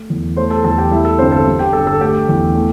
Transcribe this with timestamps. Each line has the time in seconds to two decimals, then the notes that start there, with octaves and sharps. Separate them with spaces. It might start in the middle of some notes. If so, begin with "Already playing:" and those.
Already playing: A3
0.10 E2
0.37 A3 C5 C6
0.50 A4 A5
0.64 E2 A4 A5
0.78 G4 G5
0.91 G3 E4 E5
1.05 A4
1.19 G1 C4 C5
1.32 A4
1.47 G3
1.59 G4 G5
1.73 G1 A4 A5
1.87 A4 A5
2.01 A3 G4 G5
2.29 E2
2.55 A3